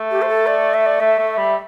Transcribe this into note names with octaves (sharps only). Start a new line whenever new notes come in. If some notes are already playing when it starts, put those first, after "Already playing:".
Already playing: A3
G4
C5
A4
D5
E5
D5
A3 E5
A3
G3